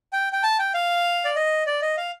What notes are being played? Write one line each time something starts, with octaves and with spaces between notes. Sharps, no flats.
G5
G5
A5
G5
F5
D5
D#5
D5
D#5
F5